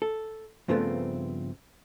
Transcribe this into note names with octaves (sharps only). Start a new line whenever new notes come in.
A4
G2 C#3 F3 A3 B3 C4